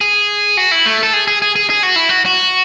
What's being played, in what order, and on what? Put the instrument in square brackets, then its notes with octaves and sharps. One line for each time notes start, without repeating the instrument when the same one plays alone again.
[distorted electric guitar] G#4
F#4
E4
A3
A4
G#4
G#4
G#4
G#4
G#4
F#4
E4
F#4
F#4